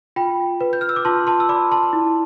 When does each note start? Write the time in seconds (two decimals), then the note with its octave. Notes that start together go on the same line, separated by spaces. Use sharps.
0.16 F4 G5 B5
0.61 B4
0.73 G6
0.81 F6
0.89 E6
0.96 D6
1.05 F4 A5 C6
1.27 A5 C6
1.40 E6
1.49 D5 B5 D6
1.72 A5 C6
1.93 E4